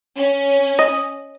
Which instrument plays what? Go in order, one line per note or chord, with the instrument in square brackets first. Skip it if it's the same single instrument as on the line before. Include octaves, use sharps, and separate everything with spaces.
[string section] C#4
[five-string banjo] D#5